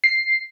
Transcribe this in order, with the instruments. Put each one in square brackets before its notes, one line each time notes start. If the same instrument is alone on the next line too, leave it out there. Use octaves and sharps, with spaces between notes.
[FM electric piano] C7